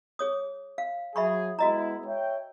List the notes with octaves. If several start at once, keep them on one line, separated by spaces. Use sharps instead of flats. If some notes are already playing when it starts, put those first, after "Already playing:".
G#4 C#5 D#6
F5
F#3 G#4 E5 B5 C#6
G#3 B3 E4 F#4 D#5 A#5
C#5 E5 G5